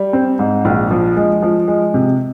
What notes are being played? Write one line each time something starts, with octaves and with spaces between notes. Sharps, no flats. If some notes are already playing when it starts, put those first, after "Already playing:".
Already playing: G3
C4
G#2
A#1
F3
G#3
F3
G#3
C3